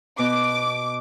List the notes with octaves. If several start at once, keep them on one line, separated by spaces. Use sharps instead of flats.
B2 D6